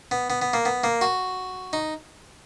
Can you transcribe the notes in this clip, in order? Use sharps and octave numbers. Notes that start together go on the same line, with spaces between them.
B3
B3
B3
A#3
B3
A#3
F#4
D#4